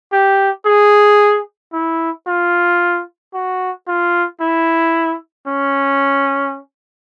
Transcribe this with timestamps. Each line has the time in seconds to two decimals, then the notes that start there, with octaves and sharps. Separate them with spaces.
0.12 G4
0.66 G#4
1.73 E4
2.27 F4
3.34 F#4
3.87 F4
4.41 E4
5.47 C#4